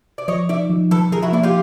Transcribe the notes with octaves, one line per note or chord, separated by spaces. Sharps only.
D5
F3 C#5 D#5
D#4 D5 E5
F3
F3 A4 B4
F3 G#4 A#4
E4 F#4
A#3 D4 E4
F4 G4